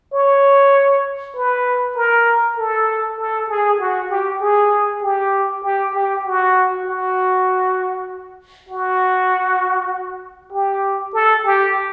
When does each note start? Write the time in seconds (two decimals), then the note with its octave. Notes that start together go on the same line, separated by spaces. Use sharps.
0.13 C#5
1.35 B4
1.96 A#4
2.58 A4
3.18 A4
3.49 G#4
3.80 F#4
4.10 G4
4.41 G#4
5.02 G4
5.63 G4
5.94 G4
6.25 F#4
6.86 F#4
8.69 F#4
10.53 G4
11.14 A4
11.45 G4